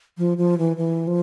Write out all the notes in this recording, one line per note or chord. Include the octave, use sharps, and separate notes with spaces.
F3
F3
E3
E3
F3